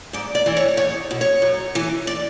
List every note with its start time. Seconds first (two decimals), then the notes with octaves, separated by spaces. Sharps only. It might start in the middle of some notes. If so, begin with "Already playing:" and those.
0.13 G#2 D5
0.35 D5
0.46 E3
0.57 C#5
0.77 E2 C#5
1.11 B2
1.21 C#5
1.42 F#2
1.75 E3
2.07 D5